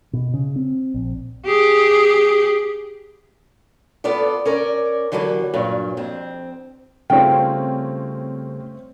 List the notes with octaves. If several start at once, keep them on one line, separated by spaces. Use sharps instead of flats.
B2
C#3
C4
A#1
G4 G#4
B3 F4 A4 D5
C#4 A#4 D5
D3 E3 F#3 G3 A3 A#3
G2 A#2 F#3
F2 C4
C#3 G3 A3 C4 C#4 F4 G5